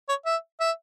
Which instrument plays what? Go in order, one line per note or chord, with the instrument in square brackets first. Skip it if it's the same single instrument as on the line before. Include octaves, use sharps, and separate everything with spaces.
[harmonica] C#5
E5
E5